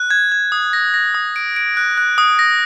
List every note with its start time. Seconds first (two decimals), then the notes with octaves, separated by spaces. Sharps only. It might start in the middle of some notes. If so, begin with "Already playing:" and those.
Already playing: F#6
0.11 G#6
0.32 G#6
0.52 D#6
0.73 A#6
0.94 A#6
1.14 D#6
1.36 D7
1.56 D7
1.77 F#6
1.98 F#6
2.18 D#6
2.39 A#6